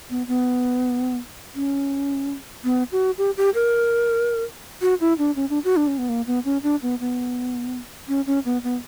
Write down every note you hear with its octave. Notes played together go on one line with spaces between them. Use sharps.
B3
B3
C#4
B3
F#4
G4
G4
A#4
F#4
E4
D4
C#4
D4
F#4
D4
C#4
B3
A#3
B3
C#4
D4
B3
B3
C#4
C#4
B3
B3